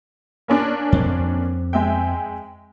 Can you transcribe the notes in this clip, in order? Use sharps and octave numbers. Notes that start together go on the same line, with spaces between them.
A#3 C#4 D4
F2 C4
G#3 E5 G5